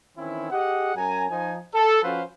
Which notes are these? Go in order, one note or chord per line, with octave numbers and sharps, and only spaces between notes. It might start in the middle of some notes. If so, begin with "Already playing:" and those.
D#3 E3 C4 C#4 E4
G4 G#4 D#5 F#5
F#2 G#5 A#5
F3 D#4 G#5
A4
F3 C#4 F#4 B4 C5 F5